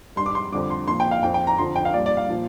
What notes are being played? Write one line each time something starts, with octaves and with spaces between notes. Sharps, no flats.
G2 G3 C6
D6
C6
F2 D3 G3 D6
C6
A#2 F3 C6
G5
F5
F2 F3 G5
G5
A#5
F2 D3 F3 C6
G5
F5
A#2 G3 D5
D5
F5
A#2 F3